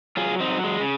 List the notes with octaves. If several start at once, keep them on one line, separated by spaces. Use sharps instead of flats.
F#3 F4 G#4
C4 D#4
F#3
G#3
C#3